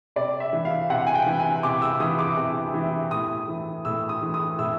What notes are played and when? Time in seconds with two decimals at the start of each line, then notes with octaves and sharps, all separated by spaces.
0.16 C3 D5
0.40 E5
0.53 E3
0.65 F5
0.90 C3 F#5
1.07 G#5
1.15 G5
1.26 E3
1.39 G#5
1.63 C3 D6
1.82 E6
2.00 E3 D#6
2.19 D6
2.37 C3
2.74 E3
3.11 A2 D#6
3.48 E3
3.85 A2 E6
4.09 D#6
4.22 E3
4.34 D#6
4.58 A2 E6